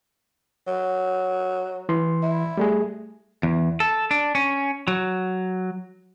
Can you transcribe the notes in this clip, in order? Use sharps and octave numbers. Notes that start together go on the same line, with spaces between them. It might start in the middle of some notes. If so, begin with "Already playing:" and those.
F#3
E3 C6
E4
G3 A3 G#4
E2
A4
D4
C#4
F#3